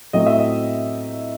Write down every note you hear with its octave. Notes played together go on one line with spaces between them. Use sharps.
A2 F#3 A3 C4 D#5
E5
D#5